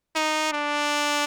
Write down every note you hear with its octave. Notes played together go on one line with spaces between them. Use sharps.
D#4
D4